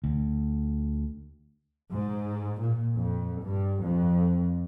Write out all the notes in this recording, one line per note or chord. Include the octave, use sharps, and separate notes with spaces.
D2
G#2
A#2
F2
G2
F2